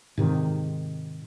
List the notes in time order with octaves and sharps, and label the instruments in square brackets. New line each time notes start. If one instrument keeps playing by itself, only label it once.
[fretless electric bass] G#2 C3 D#3